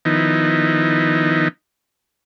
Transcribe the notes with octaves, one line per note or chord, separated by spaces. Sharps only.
D#3 F3 B3 D#4 E4